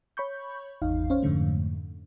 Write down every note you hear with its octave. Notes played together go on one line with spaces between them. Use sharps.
C#5 B5 C#6 G6
G#1 E2 D#4 F5
C#4 C5 C#5 F5
F2 G#2 D3 A3